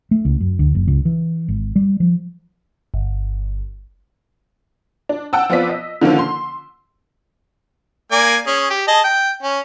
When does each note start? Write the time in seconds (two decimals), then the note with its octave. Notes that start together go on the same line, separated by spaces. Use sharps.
0.11 A3
0.25 C#2
0.40 F#2
0.59 D2
0.75 F#1
0.87 C#2
1.05 E3
1.48 G#1
1.76 G3
2.00 F3
2.94 G1
5.09 D4
5.33 F#5 G5 A5 E6
5.49 F3 B3 C4 F4 D5 B6
5.69 D#5
6.01 D3 D#3 F3 A#3 C#4
6.19 C6
8.12 A#3 D5 G#5
8.47 C#4 G#4
8.70 G4
8.88 G#4 D#5 A5
9.04 G5
9.43 C#4